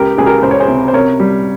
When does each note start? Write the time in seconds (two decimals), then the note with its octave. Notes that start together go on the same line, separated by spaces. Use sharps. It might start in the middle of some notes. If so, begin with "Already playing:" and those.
Already playing: C#2 G4 A#4
0.18 C#2 G#4
0.26 G4 A#4
0.43 C#2 C5
0.51 C#5
0.60 G#4 C5
0.68 C3
0.88 C5
0.93 C3 A#4 C#5
1.20 G3